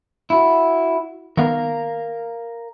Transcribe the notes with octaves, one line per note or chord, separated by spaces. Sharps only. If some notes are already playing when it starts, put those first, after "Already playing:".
E4 F#4
D#3 B3 A#4 F5